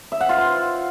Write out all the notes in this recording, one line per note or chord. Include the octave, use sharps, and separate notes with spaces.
E5
F#5
F4
C5